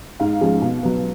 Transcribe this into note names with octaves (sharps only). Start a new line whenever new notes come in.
G#2 F5
F3 G#3 C#4
B2
F#3 B3